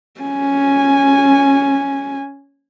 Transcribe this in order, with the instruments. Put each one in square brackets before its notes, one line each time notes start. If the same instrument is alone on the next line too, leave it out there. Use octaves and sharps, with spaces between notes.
[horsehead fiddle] C#4 G#5